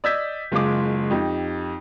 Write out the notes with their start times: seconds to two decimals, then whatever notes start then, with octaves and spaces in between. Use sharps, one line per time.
0.04 D5 D#5 E6 G6 G#6 B6
0.52 F#1 G#3 F4 G#4 D6
1.11 F2 D#4 G4